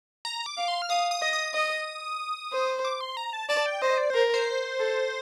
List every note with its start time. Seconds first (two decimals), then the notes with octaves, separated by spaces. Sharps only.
0.25 A#5
0.46 D6
0.57 F5
0.68 C6
0.82 F6
0.89 F5 D#6
1.11 D#6
1.22 D#5
1.33 D#6
1.54 D#5
2.53 C5
2.85 D6
3.01 C6
3.17 A#5
3.33 A5
3.49 D5 A5
3.66 G5
3.82 C5 D#5
3.98 D5
4.10 A#4 C5
4.34 C5
4.79 A4